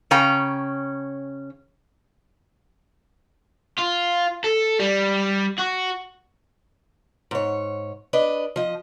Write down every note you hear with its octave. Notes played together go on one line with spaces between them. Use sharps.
C#3 C#4 G5 A#5
F4
A4
G3
F#4
G#2 C#5
D4 B4 D#5
F3 D#5